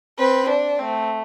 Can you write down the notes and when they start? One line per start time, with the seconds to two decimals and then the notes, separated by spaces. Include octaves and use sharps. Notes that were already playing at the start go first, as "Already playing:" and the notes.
0.19 C4 B4
0.49 D4
0.79 A3 C4